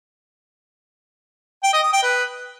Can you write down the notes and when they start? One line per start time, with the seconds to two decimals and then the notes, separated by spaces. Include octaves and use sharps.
1.64 G5
1.73 D#5
1.83 D#6
1.93 G5
2.03 B4